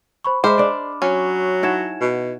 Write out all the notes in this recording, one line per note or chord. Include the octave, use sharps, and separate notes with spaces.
C5 B5 C#6
G#3 C5 E5 B5 D6 F6
D4 D5
F#3 C#4
D#4 E4 F#4 G#6 E7
B2